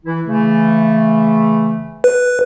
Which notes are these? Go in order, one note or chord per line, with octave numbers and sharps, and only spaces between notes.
E3 E4
C#3 E3 A3
B4